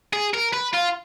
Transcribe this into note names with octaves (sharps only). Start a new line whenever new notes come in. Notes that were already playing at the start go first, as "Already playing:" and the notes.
G#4
A#4
B4
F4